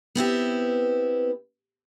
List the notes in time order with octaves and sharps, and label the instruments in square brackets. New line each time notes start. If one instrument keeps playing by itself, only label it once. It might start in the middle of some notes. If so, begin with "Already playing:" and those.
[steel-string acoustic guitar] B3 C4 E4 G4